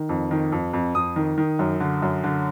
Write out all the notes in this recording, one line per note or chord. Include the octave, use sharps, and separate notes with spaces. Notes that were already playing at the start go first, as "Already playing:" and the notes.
Already playing: D#3
F2
D#3
F2
F2
F2 D#6
D#3
D#3
F#2
D3
F#2
D3